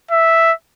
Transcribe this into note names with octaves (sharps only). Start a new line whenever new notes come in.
E5